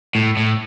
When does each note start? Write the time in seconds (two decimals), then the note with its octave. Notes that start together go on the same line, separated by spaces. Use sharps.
0.15 A2
0.37 A2